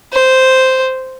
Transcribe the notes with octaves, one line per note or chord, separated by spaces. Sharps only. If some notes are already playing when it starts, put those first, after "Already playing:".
C5